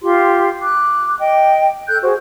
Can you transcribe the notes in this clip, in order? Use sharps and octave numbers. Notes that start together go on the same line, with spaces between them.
F4 G4 C6
D6 F#6
D#5 G5
A4 F#6 G6
F#4 G#4 C5